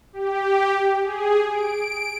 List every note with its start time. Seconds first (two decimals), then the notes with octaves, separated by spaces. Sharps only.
0.13 G4
1.03 G#4
1.50 D7